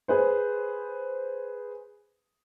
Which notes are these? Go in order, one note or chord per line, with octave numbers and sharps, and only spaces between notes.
G#4 B4 C5